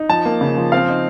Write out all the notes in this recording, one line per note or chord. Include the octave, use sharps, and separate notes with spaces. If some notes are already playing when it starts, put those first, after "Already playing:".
Already playing: D#4
F3 A5
A#3
C#3
F3
C4 F5
D#4